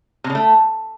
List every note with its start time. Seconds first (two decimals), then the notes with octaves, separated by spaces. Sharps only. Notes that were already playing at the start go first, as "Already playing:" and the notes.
0.24 C3
0.30 C#3
0.35 A3